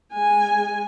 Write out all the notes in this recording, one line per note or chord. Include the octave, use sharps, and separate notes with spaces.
G#3 G#5